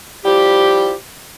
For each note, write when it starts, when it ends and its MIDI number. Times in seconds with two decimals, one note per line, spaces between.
0.25 0.92 53
0.25 0.92 55
0.25 0.92 64
0.25 0.92 67